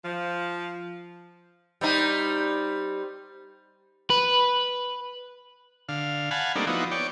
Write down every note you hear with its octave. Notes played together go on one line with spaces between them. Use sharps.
F3
G3 C4 D#4
B4
D3 F5
F5 F#5 G#5 A5 B5
G3 A3 A#3 C4 D4 D#4
F3 B3 D#4 E4 F#4
C#5 D5 G5